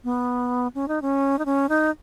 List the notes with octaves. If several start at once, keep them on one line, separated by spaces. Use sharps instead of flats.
B3
C#4
D#4
C#4
D#4
C#4
D#4